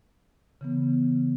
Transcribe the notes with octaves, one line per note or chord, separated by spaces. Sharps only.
C#3 E3 B3